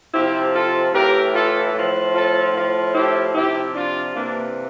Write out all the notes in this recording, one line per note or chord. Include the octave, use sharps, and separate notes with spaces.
C3 F3 E4 G4
F4 A4
A2 E3 G4 A#4
F4 A4
A2 F3
F4 A4
A2 F3
E4 G4
C3 F3 E4 G4
D4 F4
C3 E3 A#3 D4